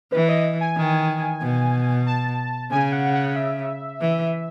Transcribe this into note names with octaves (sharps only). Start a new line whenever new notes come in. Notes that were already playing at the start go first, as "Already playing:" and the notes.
E3 B4
D#5
G#5
D#3
B2
A5
C#3 G#5
F#5
F#5
E5
E3